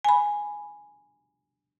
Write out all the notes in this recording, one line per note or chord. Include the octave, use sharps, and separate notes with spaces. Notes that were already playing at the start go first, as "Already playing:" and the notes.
G#5 B5